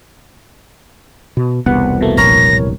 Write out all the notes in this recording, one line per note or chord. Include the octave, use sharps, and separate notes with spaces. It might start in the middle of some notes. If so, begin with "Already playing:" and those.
B2
E1 C2 B3 F#5
B2 A3 A#3
A#1 A#4 C#5 A#6